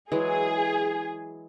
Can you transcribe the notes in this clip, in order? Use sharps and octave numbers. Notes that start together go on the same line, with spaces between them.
E3 F#3 G#3 G#4